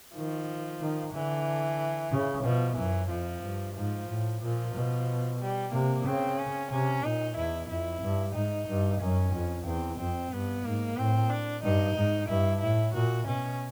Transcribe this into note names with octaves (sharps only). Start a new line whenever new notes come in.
D#3 F3
D#3
D3 E3
C#3
B2 F3
F#2 E3
F2 F3
G2
G#2 F3
A2
A#2 F3
B2
G3
C3 A#3
C#3 C4
C#4
C3 C#4
A#2 D#4
E2 E4
F2 E4
G2
G#2 D#4
G2
F#2 C#4
F2
E2 C4
F2 C4
G2 B3
G#2 A#3
A2 C4
D4
G2 D#4
G#2
G2 E4
A2 E4
A#2 F#4
B2 C#4